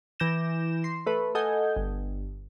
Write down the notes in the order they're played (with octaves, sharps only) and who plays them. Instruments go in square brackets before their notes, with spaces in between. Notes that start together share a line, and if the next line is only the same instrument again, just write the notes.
[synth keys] E3 D6 G6 A#6 E7
C6
A3 B4
A4 D#5 F#5 G#5 G6
G1